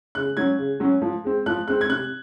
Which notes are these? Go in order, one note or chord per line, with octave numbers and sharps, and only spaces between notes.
C#3 F#6
F#3 C#4 G#6
C#3
F#3 C#4
F3
G#3 C4
F3 F#6
G#3 C4 F#6
G#6
C3 F#6